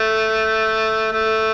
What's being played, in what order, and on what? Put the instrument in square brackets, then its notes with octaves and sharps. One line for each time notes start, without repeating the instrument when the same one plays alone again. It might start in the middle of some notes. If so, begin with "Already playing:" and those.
Already playing: [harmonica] A3
A3